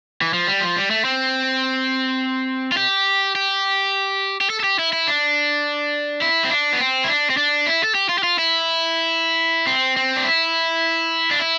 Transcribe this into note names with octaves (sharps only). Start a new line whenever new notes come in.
E3
F3
G3
F3
G3
A3
C4
F4
G4
G4
G4
A4
A4
G4
E4
E4
D4
E4
C4
D4
B3
C4
E4
D4
C4
D4
E4
A4
G4
F4
G4
F4
E4
C4
C4
D4
E4
D4
E4